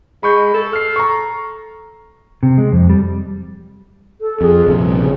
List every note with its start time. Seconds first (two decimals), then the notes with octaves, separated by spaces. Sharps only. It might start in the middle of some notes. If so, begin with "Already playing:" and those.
0.23 G#3 B5 C#6 G6
0.54 A4
0.73 F6 C7
0.96 A#5 C#6
2.43 C3
2.58 G#3
2.72 F2
2.89 G3
4.21 A4
4.41 F2 G#4
4.67 A#1 C3
4.82 G3
4.98 C#3